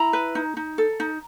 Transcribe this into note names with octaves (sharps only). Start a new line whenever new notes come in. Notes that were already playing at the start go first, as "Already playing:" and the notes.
Already playing: E4 A#5
B4
D#4
D#4
A4
D#4